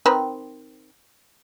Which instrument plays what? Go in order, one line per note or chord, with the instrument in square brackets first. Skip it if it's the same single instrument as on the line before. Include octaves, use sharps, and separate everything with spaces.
[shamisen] D#3 C4 B4